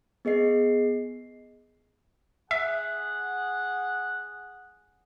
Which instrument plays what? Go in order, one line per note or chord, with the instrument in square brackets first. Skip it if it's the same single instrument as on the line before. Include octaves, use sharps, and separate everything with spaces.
[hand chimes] B3 G#4 D#5 C7
[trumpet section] G#4 F#5 [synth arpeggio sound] E5